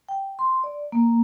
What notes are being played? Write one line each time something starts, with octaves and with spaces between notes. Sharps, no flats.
G5
C6
D5
A#3